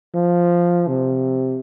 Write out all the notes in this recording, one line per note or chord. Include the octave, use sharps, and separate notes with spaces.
F3
C3